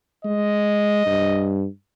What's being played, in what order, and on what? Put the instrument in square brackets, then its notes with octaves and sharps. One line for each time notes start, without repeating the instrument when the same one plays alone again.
[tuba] G#3 [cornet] D#5
[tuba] G2